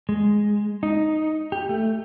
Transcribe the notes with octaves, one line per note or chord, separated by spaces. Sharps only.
G#3
D#4
G4
A3